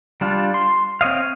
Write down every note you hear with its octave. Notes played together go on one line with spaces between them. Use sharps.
G3 D4 F4
C6
C4 C#5 D#5 F5